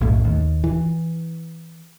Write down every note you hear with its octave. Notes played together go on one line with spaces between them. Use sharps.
B1 F#2 A2
D#2
E3